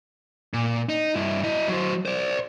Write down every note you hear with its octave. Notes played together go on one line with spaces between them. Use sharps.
A#2
D#4
G2 E4
E4 D#5
F#3 C5
C5 D5